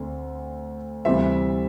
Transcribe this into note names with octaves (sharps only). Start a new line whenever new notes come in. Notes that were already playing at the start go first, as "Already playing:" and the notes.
Already playing: D2 D3 C4
D2 C3 E3 G3 C4 E5